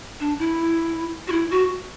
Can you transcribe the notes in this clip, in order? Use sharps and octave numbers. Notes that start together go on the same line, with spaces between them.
D4
E4
F#4
E4
F#4